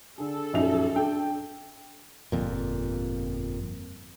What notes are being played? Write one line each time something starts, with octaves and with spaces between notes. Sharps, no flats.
D3 G#4 A4
A#1 F#2 D#4 E5 F7
D4 G5
G1 F2 A#2